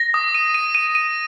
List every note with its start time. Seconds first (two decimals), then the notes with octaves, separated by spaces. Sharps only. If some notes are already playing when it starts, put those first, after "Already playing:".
Already playing: A#6
0.14 D#6
0.35 D#7
0.54 D#7
0.75 D#7
0.95 D#7